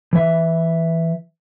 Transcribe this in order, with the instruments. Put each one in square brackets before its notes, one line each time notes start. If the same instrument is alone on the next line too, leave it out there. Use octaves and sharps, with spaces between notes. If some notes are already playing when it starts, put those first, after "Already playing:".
[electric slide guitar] E3 E5